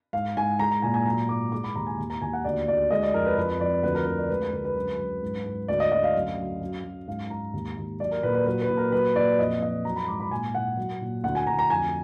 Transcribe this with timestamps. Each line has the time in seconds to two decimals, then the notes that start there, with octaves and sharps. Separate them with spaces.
0.13 G#2 F5
0.37 G#2 G#5
0.59 G#3 A#5
0.71 A#5
0.82 A#2 G#5
0.94 G#5
1.06 F#3 A#5
1.29 G#2 D6
1.52 G#3 D6
1.64 B5
1.75 D#2 A#5
1.87 G#5
1.98 D#2
2.10 A#5
2.21 D#2 G#5
2.33 F#5
2.45 D2 D5
2.68 D2 D5
2.91 G#3 D#5
3.03 D5
3.14 F2 A#4
3.26 B4
3.37 F2 B4
3.61 F2 D5
3.83 D2 B4
3.95 A#4
4.06 D2 B4
4.18 D5
4.30 G#3 B4
4.42 A#4
4.53 D2 B4
4.64 B4
4.77 F#2
4.99 F#2
5.22 G#2
5.46 G#2
5.68 D2 D5
5.80 D#5
5.91 D2 D#5
6.04 F5
6.15 F#2
6.38 F#2
6.61 F#2
6.84 F#2
7.08 G#2 F5
7.30 G#2 A#5
7.53 D#2
7.77 D#2
8.00 F#3 D5
8.11 A#4
8.23 A#2 B4
8.35 B4
8.46 F#3 B4
8.62 B4
8.70 A#2
8.77 A#4
8.92 F#3 B4
9.16 A#2 D5
9.39 F2 D#5
9.62 F2 D#5
9.85 F#3 A#5
9.96 B5
10.08 G#2 D6
10.20 B5
10.31 A#2 G#5
10.55 A#2 F#5
10.77 F#3
11.01 A#2
11.24 D2 F#5
11.35 G#5
11.47 D2 A#5
11.59 A#5
11.70 F2 G#5